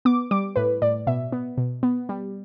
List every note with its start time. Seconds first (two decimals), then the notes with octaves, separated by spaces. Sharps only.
0.05 B3 D6
0.31 G3 D6
0.56 A2 B4
0.82 A2 D5
1.07 B2 E5
1.32 B3
1.58 B2
1.83 B3
2.09 G3